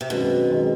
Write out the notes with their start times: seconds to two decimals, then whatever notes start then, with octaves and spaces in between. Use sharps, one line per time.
0.01 C3
0.10 F#2 B2 D#3 G#3 C4
0.48 F#2 D#3 G#3 C4